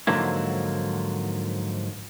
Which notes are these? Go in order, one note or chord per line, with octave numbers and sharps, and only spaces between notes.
G#2 D3 F3 F#3 A#3 E4